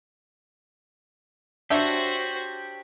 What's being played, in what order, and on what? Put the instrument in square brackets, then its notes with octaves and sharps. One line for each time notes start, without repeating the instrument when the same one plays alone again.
[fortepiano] D4 E5 [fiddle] F#4 C5 [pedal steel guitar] G4 C#5